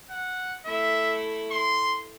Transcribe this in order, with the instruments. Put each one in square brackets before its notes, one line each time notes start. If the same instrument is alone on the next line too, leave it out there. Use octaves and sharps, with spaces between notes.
[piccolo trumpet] F#5
[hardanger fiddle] A3 E4 [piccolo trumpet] E5
[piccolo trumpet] C6